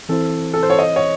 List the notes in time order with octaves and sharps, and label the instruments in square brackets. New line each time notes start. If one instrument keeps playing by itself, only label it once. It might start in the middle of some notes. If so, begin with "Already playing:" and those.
[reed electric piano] E3 C4 E4 C5 [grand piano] A4
[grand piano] A4
C5
C#5
D#5
C#5